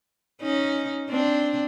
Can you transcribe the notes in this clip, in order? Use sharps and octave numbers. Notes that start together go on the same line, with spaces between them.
C#4 D#4
C4 D4